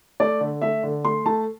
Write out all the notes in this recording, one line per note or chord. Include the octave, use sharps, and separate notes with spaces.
A3 D5
D3
A3 E5
D3
A3 C6
A3 A5